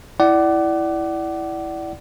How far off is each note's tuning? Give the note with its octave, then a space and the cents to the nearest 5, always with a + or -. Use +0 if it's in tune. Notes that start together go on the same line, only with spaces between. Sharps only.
E4 +0 D5 +0 F#5 +30